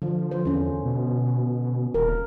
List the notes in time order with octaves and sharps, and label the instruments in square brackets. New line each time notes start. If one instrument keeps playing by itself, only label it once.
[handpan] D3 [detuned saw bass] F3
[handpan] C5
[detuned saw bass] E2 [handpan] F3 C#4
[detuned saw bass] B2
[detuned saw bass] D#1 [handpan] A#4